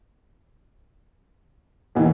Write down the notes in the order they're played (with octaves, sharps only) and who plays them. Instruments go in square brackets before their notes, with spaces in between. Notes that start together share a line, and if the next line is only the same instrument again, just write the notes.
[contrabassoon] D#2 [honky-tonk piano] B2 D#3 E3